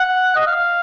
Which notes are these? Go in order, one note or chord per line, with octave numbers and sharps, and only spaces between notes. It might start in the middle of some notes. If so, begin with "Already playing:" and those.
Already playing: F#5
D#5
F5